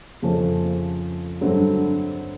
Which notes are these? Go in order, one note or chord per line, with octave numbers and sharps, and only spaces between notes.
F2 C#3 F3 A3 C#4
G2 D3 F#3 A3 C4